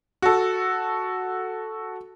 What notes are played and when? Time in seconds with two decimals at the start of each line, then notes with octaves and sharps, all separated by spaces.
0.22 F#4 A4